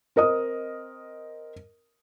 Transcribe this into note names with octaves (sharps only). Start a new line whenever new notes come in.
C4 A#4 D#5 D#6